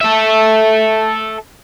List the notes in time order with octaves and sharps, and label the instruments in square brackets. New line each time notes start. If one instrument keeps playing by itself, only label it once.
[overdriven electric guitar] A4 E5